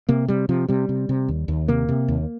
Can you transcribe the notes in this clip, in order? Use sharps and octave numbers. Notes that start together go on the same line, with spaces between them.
C3 A#3
C3 G3
C3 F3
C3 G3
C3
C3
D#2
D#2
C3 A#3
C3
D#2